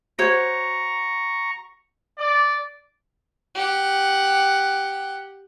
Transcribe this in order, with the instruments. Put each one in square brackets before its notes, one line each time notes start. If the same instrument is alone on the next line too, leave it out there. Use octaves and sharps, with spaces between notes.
[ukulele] F#4 C5 C#5 [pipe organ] A#5 C#6
[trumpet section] D5
[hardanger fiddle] G4 F#5